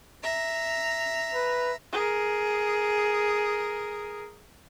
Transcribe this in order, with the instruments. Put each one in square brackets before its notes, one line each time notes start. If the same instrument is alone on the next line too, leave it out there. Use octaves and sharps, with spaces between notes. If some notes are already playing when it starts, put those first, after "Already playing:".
[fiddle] E5 A#5
[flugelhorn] B4
[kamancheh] G#4 A#4